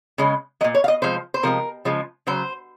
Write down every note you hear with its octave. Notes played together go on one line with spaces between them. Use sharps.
C#3 G#3
F#3 D#5
A#2
C#5
F5
D#5
C3 F3 G#3 C5
C5
C3 F3 G#3 A#4
C#3 F3 G#3
C#3 F#3 C5